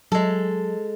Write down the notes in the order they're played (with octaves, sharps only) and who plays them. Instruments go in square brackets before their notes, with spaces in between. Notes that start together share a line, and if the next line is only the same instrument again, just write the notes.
[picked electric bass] F#3 [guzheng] G#3 A4